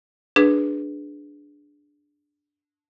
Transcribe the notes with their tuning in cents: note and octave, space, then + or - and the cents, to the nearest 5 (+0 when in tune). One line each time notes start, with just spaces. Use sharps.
D4 +0 G#4 +0 B4 +0